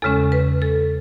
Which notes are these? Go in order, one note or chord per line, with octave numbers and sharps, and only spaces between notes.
E2 C#3 G#3 C#4 A4
B4
A4